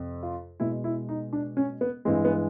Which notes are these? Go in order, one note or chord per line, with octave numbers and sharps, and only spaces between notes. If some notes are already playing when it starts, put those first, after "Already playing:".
Already playing: F2 C3
F4
B2 G#3 E4
E4
D#4
D4
C#4
B3
G2 E3 G#3 C4
B3